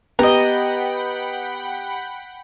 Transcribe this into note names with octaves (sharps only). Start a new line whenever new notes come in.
B3 G4 D#5 F#5 G5 A#5 B5